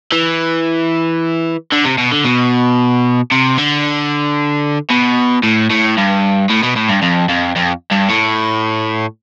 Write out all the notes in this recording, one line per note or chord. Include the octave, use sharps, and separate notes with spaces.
E3
D3
C3
B2
D3
B2
C3
D3
B2
A2
A2
G2
A2
B2
A2
G2
F2
F2
F2
G2
A2